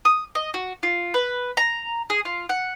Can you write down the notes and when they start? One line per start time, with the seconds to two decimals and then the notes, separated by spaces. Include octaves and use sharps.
0.05 D#6
0.35 D#5
0.54 F#4
0.83 F4
1.14 B4
1.57 A#5
2.10 G#4
2.25 F4
2.49 F#5